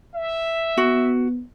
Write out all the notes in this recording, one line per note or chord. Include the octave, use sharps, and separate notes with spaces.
E5
B3 F#4